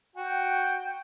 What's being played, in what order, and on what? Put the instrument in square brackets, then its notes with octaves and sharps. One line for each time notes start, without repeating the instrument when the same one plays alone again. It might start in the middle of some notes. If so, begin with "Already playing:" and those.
[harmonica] F#4 [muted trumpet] G5